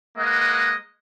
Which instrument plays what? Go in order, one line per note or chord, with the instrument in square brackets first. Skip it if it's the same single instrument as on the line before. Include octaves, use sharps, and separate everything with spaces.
[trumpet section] G#3 A#3 B4 D#5 F#5